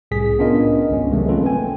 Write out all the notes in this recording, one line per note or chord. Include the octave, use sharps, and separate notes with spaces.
C2 A2 G#4 B6
B3 C#4 D4 F4 A#4 D#5
G#1 C#2 C#4
C3 D#3 F3 F#3 G#3 A3
A#3 C4 C#4 F4 A4 B4
G5 G#5